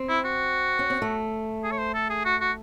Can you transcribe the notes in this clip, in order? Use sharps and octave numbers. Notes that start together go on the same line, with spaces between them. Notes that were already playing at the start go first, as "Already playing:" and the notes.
Already playing: C4
E4
F#4
C#4
C4
A3
G#4
C#5
C5
A4
G#4
F#4
F#4